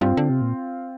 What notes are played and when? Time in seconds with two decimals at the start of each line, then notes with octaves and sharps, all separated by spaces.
0.01 G2 C4 F4
0.17 D3
0.30 C3
0.41 A#2